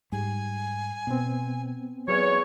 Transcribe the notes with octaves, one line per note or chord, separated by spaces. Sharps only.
G#2 G3 G#5
B2 B3 C4
E2 F#3 C#5